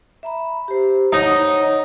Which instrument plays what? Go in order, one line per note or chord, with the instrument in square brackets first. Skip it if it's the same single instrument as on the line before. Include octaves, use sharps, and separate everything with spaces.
[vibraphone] E5 A#5 B5
G4 C5
[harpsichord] D#4 [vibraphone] C#5 F#5